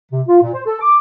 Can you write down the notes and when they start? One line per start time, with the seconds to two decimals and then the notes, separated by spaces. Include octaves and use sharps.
0.12 C3
0.28 F4
0.42 A#2
0.54 C5
0.67 A4
0.81 D6